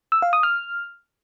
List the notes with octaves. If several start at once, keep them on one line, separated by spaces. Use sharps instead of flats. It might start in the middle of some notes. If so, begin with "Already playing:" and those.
E6
F5
D#6
F6